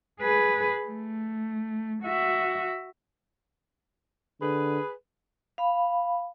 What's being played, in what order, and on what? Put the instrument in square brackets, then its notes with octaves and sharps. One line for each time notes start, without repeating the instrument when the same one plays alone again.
[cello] G#4 B4
A3
F#4 E5
[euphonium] D3 [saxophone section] G#4 B4
[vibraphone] F5 B5